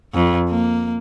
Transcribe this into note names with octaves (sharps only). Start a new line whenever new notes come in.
F2
A#3